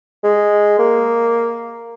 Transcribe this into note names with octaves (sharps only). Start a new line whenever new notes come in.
G#3
A#3